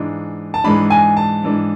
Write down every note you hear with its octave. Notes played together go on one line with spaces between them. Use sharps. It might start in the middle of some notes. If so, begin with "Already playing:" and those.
Already playing: G#2 E3 G#3 D4
A5
G#2 E3 G#3 D4 B5
G#5
A5
G#2 E3 G#3 D4